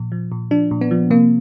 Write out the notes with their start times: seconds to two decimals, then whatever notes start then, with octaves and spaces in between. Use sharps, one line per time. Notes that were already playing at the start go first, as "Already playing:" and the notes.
Already playing: A#2 F3
0.12 F3
0.32 A#2
0.51 F3 D4
0.71 A#2
0.81 B3
0.91 F3
1.10 C3 A#3